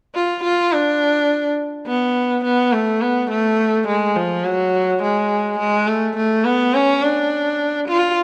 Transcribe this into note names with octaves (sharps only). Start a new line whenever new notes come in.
F4
F4
D4
B3
B3
A3
B3
A3
G#3
F3
F#3
G#3
G#3
A3
A3
B3
C#4
D4
F4